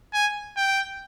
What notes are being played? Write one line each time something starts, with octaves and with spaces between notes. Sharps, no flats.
G#5
G5